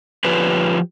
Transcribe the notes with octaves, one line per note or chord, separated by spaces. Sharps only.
F3 F4 G4 B4 C#5 D5